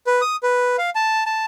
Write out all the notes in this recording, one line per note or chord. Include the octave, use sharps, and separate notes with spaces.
B4
D#6
B4
F5
A5
A5